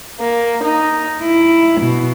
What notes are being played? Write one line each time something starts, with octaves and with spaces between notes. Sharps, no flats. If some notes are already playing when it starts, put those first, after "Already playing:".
A#3
D#4
E4
B2